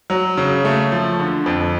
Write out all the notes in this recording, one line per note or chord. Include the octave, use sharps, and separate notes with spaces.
F#3
C#3
A3
F3
D3
F2